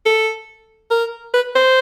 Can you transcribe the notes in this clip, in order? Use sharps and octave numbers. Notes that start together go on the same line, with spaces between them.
A4
A#4
B4
C5